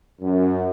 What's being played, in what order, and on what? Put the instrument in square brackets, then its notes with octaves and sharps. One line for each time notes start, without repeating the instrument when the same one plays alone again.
[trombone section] F#2